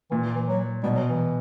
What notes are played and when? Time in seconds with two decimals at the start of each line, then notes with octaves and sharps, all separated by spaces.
0.11 A#2 E3
0.35 E3
0.47 F#3
0.83 B2 G3
0.95 F#3
1.07 E3